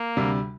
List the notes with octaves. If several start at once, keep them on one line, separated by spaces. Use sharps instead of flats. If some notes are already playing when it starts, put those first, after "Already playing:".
Already playing: A#3
D2 C3 G3